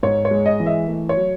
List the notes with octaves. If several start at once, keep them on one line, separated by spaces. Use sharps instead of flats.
G#2 C#5
C#5
G#3
D#5
E3
E5
A3
C#5
F#3